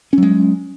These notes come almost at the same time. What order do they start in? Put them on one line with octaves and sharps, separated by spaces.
C#4 F#3 G#3